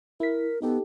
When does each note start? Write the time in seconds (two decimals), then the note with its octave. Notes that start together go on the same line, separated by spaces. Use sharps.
0.20 E4 A#4 B6
0.62 B3 D#4 G4 A4